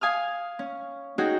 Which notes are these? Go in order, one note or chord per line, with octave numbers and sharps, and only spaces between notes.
F5 G#5 D#6 F6
C#4
C#4 D#4 F#4 G#4 G5